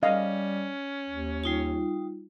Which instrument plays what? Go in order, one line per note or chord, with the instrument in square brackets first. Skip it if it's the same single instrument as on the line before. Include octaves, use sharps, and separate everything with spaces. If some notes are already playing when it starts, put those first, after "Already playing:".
[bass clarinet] G3 [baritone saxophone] C#4 [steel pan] D#5 F5
[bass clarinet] D#2
[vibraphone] G3 D#4 F4